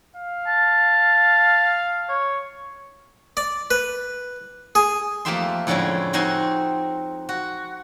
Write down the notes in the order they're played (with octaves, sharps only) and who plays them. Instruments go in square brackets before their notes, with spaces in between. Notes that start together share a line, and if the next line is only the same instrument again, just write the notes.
[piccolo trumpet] F5
[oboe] A5
C#5
[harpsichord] D5
B4
G#4
[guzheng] F2 A3 A#3 G4 E5 C6
F2 A2 D3 G#3 C#4 E4
F2 C4 D#4 F#4 G#5 C6
F#4